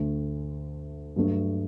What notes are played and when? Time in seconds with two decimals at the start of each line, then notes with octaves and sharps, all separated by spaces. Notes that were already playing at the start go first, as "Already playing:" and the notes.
Already playing: D2 D3 A3
1.16 G2 F#3 A3 D4